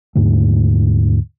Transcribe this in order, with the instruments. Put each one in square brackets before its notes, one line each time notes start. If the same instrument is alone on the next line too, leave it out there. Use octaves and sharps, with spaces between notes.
[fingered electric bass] D#2 G#2 D3 A3